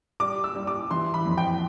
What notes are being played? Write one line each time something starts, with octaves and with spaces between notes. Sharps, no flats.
G3 D6
E6
G3
D6
E3 C6
B5
F2
G5